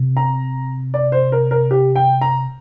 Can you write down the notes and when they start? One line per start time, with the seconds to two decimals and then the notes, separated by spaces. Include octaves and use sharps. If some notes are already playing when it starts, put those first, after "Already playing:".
Already playing: C3
0.17 A#5
0.94 D5
1.12 C5
1.32 A#4
1.51 A#4
1.71 G4
1.96 G5
2.21 A#5